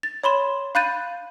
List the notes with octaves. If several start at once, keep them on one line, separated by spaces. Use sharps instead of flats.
A6
C#5 B5 C6 E7
F5 B5 F#6 G6 A6 D#7